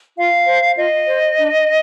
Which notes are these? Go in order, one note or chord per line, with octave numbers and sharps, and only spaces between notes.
F4 F5
C5
F4 D#5
C5
D4